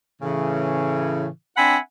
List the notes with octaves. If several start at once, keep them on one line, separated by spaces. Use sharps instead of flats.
A2 C#3 E3
C4 D4 E5 F#5 G#5 B5